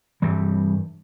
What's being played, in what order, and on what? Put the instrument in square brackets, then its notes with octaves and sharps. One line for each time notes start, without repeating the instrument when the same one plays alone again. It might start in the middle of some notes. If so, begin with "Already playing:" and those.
[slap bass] G2 E3 G3